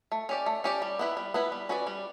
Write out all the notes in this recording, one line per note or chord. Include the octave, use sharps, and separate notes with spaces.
A3
C#4 G4 D5
A3
C#4 G4 D5
G3
B3 E4 B4
G3
B3 E4 B4
G3
C#4 F#4 B4 D5
G3